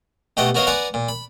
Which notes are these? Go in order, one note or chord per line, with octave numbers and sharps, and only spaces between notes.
B2 A3 G4 D#5 F#5 G5
B3 F#4 A#4 C#5 D#5 F5
B4 D5 F#5 G#5 A#5
A#2
B5